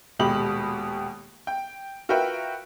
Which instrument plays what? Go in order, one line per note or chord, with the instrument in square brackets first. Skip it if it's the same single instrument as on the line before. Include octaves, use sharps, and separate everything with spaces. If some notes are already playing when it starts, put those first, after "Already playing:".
[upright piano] D#1 B2 G#3 G4 B5 F#7
G5
F4 F#4 A#4 B4 E5 G5